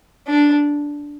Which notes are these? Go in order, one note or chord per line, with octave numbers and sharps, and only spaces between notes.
D4